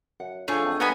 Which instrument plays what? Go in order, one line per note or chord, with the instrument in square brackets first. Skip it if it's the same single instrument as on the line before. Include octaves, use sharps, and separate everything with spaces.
[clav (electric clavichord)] F#2 [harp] F#5
[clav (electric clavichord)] F3 C#4 [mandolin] A3 G#4 [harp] D4 F4 C#5
[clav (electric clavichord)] F2
[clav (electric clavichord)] G2 A#3 [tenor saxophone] B3 [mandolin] D#5 G#5 B5 [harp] D#6